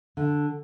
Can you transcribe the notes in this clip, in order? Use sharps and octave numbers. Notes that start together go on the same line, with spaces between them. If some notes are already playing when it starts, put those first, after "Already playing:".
D3